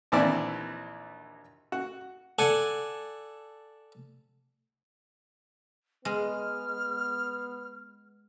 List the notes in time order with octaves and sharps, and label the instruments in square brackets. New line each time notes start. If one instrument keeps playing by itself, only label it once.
[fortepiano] A#1 D#2 E3 C4 E4 D5
F#4
[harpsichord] A4 D5 F#5 G#5 A5
[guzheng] G#3 [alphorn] B3 [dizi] F6